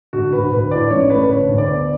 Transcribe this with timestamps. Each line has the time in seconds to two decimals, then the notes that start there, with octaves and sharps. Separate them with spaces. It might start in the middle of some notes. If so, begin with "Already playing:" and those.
0.13 D3 F#4
0.32 D2 B4
0.52 D2 B4
0.71 A2 D5
0.90 A1 C#5
1.10 A3 B4
1.23 B4
1.29 D3 C#5
1.49 D2
1.58 D5
1.69 B3